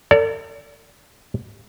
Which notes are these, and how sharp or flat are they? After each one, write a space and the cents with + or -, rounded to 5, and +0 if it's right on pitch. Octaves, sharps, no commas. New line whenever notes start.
A4 +45 D5 -30